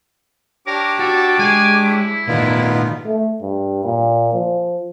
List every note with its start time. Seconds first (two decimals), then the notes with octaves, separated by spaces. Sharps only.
0.67 D4 G4 A#4 C#5 D6
0.99 F#4 A4
1.39 G#3 G#5
1.85 E4
2.28 A#2 D#3 A3 B3 D#4 F4
3.06 A3
3.42 G2
3.85 A#2
4.33 F3